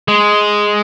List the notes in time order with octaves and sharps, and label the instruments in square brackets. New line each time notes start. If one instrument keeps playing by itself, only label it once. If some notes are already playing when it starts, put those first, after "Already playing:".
[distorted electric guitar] G#3